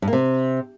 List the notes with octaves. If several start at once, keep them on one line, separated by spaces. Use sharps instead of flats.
G2
A#3
C3